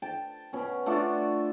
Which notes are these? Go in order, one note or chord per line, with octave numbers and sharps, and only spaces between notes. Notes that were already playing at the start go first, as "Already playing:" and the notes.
G5 A5
B2 C#4
A3 D4 F4 F#4